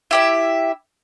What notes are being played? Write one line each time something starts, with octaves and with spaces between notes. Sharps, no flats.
E4 G4 E5